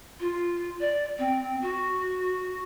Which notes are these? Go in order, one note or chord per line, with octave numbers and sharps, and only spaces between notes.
F4
D5
C4
F#4